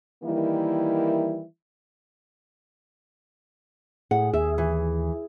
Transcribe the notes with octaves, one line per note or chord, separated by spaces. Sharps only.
D#3 E3 G3 A#3 E4
A2 G#4 F#5
D#2 G#4 E5
E3